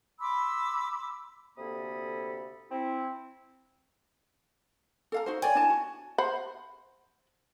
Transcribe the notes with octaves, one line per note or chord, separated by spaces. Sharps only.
B5 C6 D6 E6
D2 C3 A#3 A4 B5 D#6
C4 E4
A4 F5 A#5
D#4 F#4 C5
C#5 D5 G5 G#5
D4 E4 A5
F#4
C5 F#5 B5